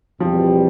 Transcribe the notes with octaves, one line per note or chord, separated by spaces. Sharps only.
E2 B2 F3 G3 C4 G4